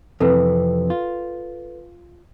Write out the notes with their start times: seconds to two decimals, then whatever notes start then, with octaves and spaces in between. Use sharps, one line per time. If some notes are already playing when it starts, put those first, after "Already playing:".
0.20 F2 C3 E3 A4 B4
0.90 F4